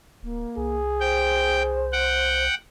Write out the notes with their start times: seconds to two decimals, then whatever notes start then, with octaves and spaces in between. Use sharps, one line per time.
0.23 D1 A#3
0.57 C2 G#4
1.00 C5 G5
1.92 F#5 G5